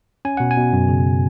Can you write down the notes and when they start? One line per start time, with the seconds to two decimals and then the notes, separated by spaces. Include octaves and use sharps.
0.25 C#4 G#5
0.37 B2 F#5
0.51 G#5
0.57 B2
0.73 F#2
0.88 C#3